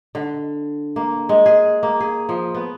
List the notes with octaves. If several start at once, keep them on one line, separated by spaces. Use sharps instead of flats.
D3
A#3
G#3
G#4
A#3
G#4
F3
B3